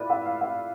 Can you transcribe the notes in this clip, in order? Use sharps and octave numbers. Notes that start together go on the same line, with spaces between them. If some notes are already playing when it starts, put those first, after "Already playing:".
Already playing: A2 E4 F4 G4 B4 D5
E5
F5
E5